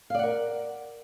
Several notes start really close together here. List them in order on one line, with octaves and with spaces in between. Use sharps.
F5 D5 F#5 A#4